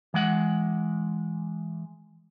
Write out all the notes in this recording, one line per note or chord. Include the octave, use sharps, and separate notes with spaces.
E3 G#3 F#5